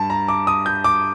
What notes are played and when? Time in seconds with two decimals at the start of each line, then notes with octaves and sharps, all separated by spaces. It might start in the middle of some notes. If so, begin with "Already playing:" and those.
Already playing: G2 A5
0.10 A#5
0.28 D6
0.47 D#6
0.66 G6
0.84 D6